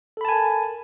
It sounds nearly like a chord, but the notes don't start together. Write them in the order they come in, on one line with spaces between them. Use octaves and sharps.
A4 B5 A5 G#5 A#4